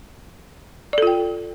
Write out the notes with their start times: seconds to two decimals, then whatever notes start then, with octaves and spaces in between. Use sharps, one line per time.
0.93 D5
0.98 A4
1.02 F4
1.07 G5